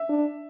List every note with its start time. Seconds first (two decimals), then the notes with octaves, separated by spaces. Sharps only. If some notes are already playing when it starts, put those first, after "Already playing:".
Already playing: E5
0.09 D4